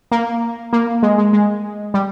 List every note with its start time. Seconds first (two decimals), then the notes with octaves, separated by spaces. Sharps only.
0.12 A#3
0.73 A#3
1.03 G#3
1.18 G#3
1.33 G#3
1.94 G3